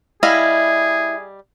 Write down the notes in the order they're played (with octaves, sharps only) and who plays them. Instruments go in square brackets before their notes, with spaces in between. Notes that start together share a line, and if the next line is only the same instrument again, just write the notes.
[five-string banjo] G3 D#5 F5 [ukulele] E4 [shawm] G#4